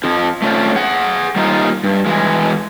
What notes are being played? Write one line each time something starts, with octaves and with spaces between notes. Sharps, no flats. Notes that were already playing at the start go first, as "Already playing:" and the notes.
F2 F3
A3 C#4 F4 A#4 C5 D5
G#4 F#5
G3 A#3 D#4 F4 A#4 C5
G2
E3 G#3